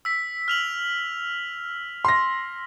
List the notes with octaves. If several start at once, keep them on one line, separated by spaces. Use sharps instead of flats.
E6 B6
F6 F7 F#7
C6 A#6